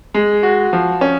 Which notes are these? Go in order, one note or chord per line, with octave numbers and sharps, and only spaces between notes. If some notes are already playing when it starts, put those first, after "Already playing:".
G#3
F#4
F3
C#4